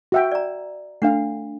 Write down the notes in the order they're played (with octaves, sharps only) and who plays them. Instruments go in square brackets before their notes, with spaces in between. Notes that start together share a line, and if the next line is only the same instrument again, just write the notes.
[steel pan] F#4 E5 G5
[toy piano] D5 A#5
[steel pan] A3 F5 [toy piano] D4 F#5